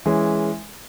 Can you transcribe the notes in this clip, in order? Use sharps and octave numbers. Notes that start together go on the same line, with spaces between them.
E3 G#3 C#4